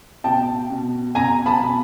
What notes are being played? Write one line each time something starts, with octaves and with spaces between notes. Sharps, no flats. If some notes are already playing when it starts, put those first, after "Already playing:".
B2 G5 A5
B2
B2 G#5 A#5
A5 B5
B2